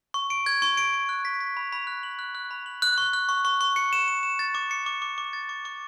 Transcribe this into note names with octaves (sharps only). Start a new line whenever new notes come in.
C#6
D7
G#6
C#6
D7
D7
F#6
B6
B6
B5
B5
F#6
F#7
F#6
F#6
B5
F#7
F#6
C#6
F#6
C#6
C#6
C#6
C#7
E7
E7
E7
A6
D6
C#7
D6
D6
D6
A6
D6
D6